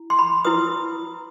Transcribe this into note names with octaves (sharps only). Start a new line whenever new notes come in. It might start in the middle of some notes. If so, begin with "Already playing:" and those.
Already playing: E4
C6
B5
E4 B4 D#6